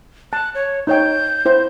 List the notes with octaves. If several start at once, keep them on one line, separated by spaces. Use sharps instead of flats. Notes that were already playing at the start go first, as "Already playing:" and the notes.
A5 F#6
C#5
D#4 C#5 G5 G6
E4 C5